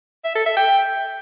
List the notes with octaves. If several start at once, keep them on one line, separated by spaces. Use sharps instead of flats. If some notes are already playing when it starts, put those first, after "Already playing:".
E5
A4
E5
G5